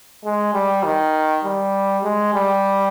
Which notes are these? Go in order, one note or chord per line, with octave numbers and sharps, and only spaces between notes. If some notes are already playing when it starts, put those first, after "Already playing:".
G#3
G3
D#3
G3
G#3
G3